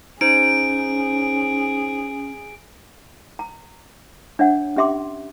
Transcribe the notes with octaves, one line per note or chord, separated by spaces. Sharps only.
C#4 D#4 G#4 C5 D7
A#5
D4 C#5 E5 F#5
C#4 G4 E5 C6 D6